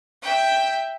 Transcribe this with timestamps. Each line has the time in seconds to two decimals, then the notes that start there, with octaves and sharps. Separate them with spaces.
0.22 E5 G5